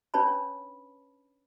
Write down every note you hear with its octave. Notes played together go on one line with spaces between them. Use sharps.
C#4 D4 B4 C#5 A5 B5